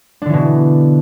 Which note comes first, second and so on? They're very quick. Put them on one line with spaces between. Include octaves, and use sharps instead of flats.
D4 D3 E3 B2